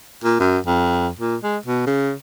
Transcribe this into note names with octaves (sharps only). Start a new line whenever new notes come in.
A#2
F#2
F2
A#2
G#3
B2
C#3